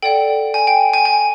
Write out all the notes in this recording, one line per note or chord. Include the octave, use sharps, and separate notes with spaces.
A4 D5 F#5 G5
G#5
G5
G#5
G#5